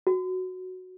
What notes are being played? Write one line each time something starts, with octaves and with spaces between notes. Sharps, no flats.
F#4